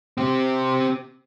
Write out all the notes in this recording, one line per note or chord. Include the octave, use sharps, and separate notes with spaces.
C4 G4